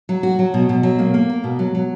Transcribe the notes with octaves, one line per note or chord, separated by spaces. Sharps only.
F#3
F#4
F#3
B2
B2
F#3
A#3
A#3
A#4
B2
F#3
F#3